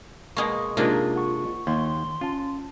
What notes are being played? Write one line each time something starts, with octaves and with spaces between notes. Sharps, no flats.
B2 G#3 A#3 C#6 D#6
C3 G#3 A#3 D4 D#4 F4
F#5 C#6
D#2 C6
C#4 F4 A5